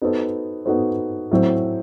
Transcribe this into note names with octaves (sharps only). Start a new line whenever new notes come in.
B3 D#4 F#4 A4 C5
B3 D#4 F#4 A4 C5
A2 F#3 C4